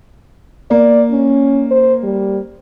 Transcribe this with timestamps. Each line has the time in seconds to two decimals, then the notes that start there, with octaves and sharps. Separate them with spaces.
0.71 A#3 D5
1.11 C#4
1.71 C5
2.03 G3